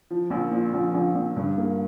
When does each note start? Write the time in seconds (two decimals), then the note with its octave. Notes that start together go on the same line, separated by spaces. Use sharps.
0.10 F3
0.30 A#1
0.51 A#2
0.74 A#1
0.94 A#1
1.15 A#1
1.36 G2
1.58 A#3